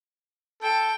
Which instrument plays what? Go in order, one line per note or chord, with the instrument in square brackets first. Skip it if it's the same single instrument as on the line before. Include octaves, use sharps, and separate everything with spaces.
[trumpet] A4 [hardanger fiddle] G5